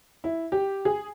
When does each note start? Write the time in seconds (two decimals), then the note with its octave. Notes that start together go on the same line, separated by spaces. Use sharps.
0.24 E4
0.52 G4
0.85 G#4